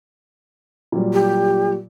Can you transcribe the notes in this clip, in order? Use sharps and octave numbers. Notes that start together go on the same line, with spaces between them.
A#2 F#3 G3
G4